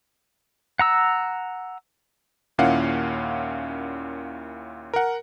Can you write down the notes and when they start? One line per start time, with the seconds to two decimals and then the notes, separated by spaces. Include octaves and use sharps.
0.79 F#5 A#5 E6
2.58 D#2 A#2 C#4 E4 F5 F#5
4.93 A#4 F#5